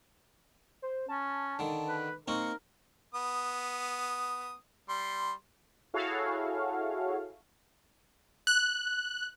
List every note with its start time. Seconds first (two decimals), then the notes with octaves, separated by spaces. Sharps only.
0.82 C5
1.09 C#4 A5
1.59 D3 D#3
1.88 B4
2.28 A#3 C4 D#4 A#4 C#6
3.14 B3 D#6
4.89 G3 C6
5.94 E4 F#4 G#4 A4 C#5 F5
8.47 F#6